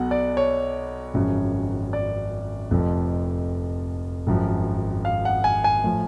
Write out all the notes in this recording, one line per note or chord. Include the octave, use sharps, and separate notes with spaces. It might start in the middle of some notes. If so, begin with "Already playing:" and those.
Already playing: B1 B2 F#5
D5
C#5
G#1 F#2 C#3 F3
D5
F1 F2 F3
G#1 F#2 F3
F5
F#5
G#5
G#5
A2 F3